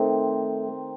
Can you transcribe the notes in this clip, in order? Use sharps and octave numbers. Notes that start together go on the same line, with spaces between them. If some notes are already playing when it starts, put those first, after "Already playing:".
Already playing: D#3 A3 C4 D#4